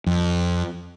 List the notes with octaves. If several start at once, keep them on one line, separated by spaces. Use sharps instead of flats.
F2